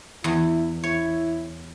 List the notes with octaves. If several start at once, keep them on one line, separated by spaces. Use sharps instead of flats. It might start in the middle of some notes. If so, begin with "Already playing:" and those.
E2 E4
E4 C#5